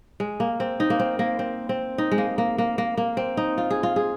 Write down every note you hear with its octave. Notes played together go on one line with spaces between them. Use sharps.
G#3
A#3
C4
D#4
A#3
C4
A#3
C4
C4
D#4
G#3
A#3
A#3
A#3
A#3
A#3
C4
D#4
F4
G#4
F4
G#4